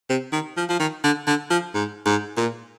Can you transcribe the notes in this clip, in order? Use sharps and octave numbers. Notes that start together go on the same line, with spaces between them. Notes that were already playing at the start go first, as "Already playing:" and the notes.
C3
D#3
F3
F3
D#3
D3
D3
F3
G#2
G#2
A#2